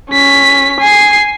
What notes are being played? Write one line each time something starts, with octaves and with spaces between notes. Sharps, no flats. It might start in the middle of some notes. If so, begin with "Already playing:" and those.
C#4 B6
G#5 C7